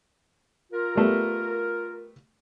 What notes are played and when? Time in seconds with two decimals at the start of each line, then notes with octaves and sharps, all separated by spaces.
0.72 F4 A#4
0.95 G3 A3 B3